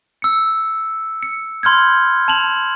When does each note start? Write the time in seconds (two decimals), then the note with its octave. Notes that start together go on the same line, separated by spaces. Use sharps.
0.22 E6 C#7
1.23 C#7
1.63 B5 C6 F6 G6 G#6
2.28 A5 F7 F#7